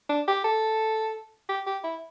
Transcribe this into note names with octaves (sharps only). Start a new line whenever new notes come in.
D4
G4
A4
G4
G4
E4